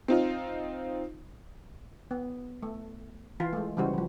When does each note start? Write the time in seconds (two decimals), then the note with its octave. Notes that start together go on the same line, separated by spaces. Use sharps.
0.08 C4 D#4 F4
2.11 B3
2.63 A3
3.40 E3 F4
3.53 G#3 A3
3.77 C#3 E3 G3 F#4 C5
3.94 E3 F3